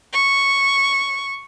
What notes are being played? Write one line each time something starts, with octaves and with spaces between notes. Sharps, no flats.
C#6